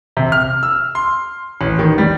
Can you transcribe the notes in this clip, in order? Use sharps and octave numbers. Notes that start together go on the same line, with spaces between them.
C3
F6
E6
C6
A1
D#3
G3